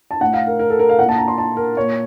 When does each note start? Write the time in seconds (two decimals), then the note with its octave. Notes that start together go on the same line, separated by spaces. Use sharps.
0.11 A5
0.21 A2 F#5
0.34 F5
0.47 A#4
0.59 A#4
0.70 A4
0.79 A#4
0.89 F5
0.99 A#2 F#5
1.09 A5
1.18 A#5
1.28 C6
1.38 A5
1.57 A#4
1.77 A#2 C#5